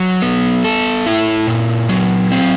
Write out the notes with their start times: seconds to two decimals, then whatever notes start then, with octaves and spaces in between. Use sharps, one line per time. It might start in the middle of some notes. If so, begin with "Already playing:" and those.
Already playing: F#3
0.22 B3
0.64 A4
1.06 E4
1.47 A#2
1.89 F#3
2.32 C4